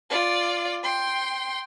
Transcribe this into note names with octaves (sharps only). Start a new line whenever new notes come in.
F4 D5
G5 C6